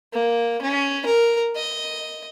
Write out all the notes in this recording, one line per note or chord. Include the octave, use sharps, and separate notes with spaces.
A#3
C#4
A#4
D#5